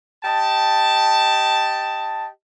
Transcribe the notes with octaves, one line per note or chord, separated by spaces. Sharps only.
G4 D#5 A5